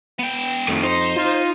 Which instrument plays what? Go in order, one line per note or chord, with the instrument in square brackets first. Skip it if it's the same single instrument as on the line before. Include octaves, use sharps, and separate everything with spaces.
[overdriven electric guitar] B3 G5
[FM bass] F2 [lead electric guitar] D#3 A3
[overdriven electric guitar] D#4 [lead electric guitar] C5
[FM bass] F4